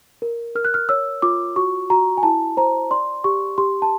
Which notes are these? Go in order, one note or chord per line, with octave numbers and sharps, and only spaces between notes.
A#4
A#4 F6
F#6
F6
C#5 E6
F4 D6
F#4 C#6
F#4 A#5
G#5
E4 A5
C5 A#5
D5 C6
G4 C#6
G4 C6
A5